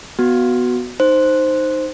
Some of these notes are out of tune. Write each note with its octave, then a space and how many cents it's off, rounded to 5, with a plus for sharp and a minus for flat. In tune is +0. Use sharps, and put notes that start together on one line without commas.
B3 +0 F#4 +0
D#4 -5 C5 +0